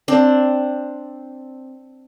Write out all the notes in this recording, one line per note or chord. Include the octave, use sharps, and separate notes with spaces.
C4 D4